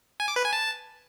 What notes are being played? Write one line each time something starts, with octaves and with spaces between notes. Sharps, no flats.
G#5
D6
B4
G#5
A5